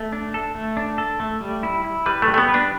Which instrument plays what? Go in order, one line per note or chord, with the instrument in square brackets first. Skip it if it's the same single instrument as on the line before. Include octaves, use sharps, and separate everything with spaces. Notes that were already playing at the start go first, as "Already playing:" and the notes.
Already playing: [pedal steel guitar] A3
D4
A4
A3
D4
A4
A3
G3
E4
E4
[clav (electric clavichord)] G3 [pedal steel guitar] B4
[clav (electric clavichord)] A3
[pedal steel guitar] G3
[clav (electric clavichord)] A3
B3
[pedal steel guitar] B4
[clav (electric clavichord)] D4